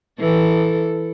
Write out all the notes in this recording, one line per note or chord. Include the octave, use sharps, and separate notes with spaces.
E3 A4